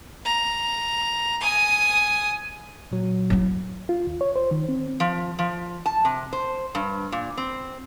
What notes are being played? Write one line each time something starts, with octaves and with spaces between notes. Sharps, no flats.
A#5
G#5 D#6
A#2 F#3
F#3 E4
F4
D#2
C#5
C5
D#3
C4
F3
F3
A5
C3
C5
G2
A#2
C4